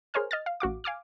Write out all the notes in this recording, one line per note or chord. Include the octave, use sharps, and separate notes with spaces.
G#4 A#4 C5 C#5 G#5 F6
D#5 F6 A6
F5
A1 F#4 F5 D6
F5 G#5 D6 F6